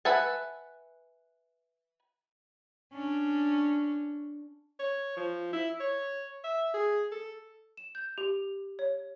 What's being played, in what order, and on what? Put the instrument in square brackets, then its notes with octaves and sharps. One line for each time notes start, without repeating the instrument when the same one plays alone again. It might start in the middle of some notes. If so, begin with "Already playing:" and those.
[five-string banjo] B4 E5 F#5 G#5 A5
[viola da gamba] C#4 D4
[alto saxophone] C#5
F3
E4
C#5
E5
G#4
A4
[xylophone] E7
G6
G4
C#5